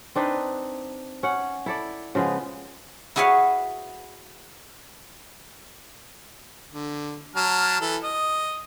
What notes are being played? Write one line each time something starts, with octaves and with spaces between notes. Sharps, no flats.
C4 D4 D#4 B4
C#4 F#5
E4 A4 D5
C#3 F3 G#3 B3
E4 F#4 G#4 B4 C#5 F5
D3
F#3 A5 F6
E3 A4
D#5